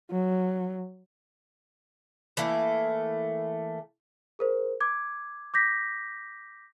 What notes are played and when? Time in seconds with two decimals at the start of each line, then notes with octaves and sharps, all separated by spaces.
0.11 F#3
2.37 E3 A3 A#3
4.39 G#4 A#4 C5
4.81 D6 G#6
5.54 D6 G6 A#6 B6